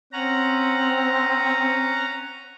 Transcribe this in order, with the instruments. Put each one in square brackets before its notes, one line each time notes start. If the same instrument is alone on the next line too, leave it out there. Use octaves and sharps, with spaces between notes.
[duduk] C4 [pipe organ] C#4 F#5 A#5